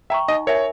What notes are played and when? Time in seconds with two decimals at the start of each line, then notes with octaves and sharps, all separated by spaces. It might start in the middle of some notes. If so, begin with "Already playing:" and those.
0.10 E5 G5 A#5 C#6
0.28 D#4 D#5
0.47 A#4 C#5 E5 G#5